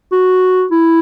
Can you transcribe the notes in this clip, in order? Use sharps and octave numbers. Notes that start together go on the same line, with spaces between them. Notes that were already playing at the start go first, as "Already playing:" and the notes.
F#4
E4